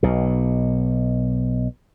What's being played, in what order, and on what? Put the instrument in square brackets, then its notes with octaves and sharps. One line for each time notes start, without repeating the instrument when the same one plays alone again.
[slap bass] B1 B2